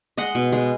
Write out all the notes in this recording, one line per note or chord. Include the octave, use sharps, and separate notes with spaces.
G#3 D#5 F#5
B2
G#3